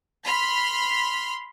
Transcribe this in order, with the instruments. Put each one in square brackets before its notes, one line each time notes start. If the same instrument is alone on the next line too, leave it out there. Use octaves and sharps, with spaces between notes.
[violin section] B5 C6 F6 B6